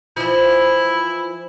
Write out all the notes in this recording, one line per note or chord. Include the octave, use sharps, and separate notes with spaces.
E3 F3 E4